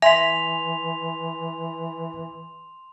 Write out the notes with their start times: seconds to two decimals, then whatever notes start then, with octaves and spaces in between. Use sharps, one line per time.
0.02 E3 E5 G#5 C6 B6 F7